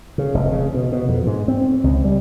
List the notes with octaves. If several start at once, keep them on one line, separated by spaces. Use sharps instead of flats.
C#3
F1
C#3
B2
B2
F2
G#2
C4
C#2
G3